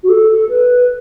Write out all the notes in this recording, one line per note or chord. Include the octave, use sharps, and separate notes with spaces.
F#4
A4
B4